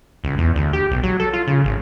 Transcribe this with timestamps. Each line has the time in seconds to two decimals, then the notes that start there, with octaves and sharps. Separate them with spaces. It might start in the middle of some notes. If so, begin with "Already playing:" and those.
0.24 C#2
0.38 E2
0.56 D2
0.73 G4
0.91 B1
1.03 F#3
1.20 A4
1.33 F4
1.47 C#3
1.64 G#1